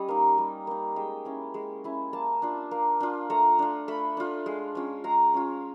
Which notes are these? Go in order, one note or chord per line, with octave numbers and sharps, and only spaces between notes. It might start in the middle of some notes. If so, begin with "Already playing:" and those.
Already playing: G3 C#4 D#5
A#3 D#4
G3
A#3 D#4
G#3 G5
C#4 E4
G#3
C#4 E4
A#3 A5
D4 F4
A#3
D4 F4
A3 A#5
D4 F4
A3 B5
D4 F4
G#3
C#4 F4
G#3 A#5
C#4 F4